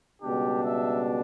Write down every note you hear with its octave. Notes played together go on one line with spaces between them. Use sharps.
C#2 B2 G3 D4 G4
E5